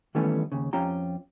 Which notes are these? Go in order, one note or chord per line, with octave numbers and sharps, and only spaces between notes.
D#3 E3 G3 A3 B3 C#4
D#2 C#3
F2 C#4 F4 G4 A#5